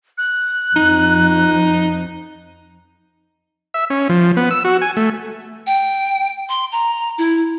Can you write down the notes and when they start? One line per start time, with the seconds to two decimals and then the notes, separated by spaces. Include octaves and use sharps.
0.18 F#6
0.76 F2 D#4
3.74 E5
3.90 C#4
4.09 F3
4.37 B3
4.51 E6
4.65 F#4
4.82 G#5
4.97 A3
5.67 G5
6.49 C6
6.72 A#5
7.18 E4